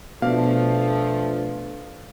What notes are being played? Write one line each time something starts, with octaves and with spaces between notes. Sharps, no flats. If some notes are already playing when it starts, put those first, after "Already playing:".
B2 F3 A3 D4 B4 D5 F5